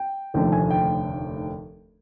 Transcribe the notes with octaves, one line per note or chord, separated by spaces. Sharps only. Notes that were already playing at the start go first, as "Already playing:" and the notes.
Already playing: G5
F1 D#2 D3 F3 A3 G5
G#5
G5